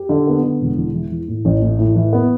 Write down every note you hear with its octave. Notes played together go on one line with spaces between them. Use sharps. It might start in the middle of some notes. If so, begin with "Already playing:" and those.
Already playing: G4
D3
B3
D3
E1
E2
E3
E3
A2
A1
A2
A2
E3
B3